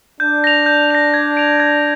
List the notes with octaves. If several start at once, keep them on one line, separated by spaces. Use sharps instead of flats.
D4 G6
A#6 F7
G6
A#6 F7
G#6
D7 F7
G#6